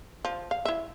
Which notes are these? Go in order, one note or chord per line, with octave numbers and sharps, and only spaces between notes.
F3
F5
E4 E5